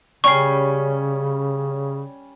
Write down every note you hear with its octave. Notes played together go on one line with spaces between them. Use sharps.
C#3 G3 C#4 C#6 C7